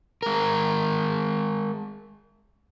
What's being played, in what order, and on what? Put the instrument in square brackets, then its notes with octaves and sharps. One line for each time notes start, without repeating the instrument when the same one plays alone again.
[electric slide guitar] G#3 A#4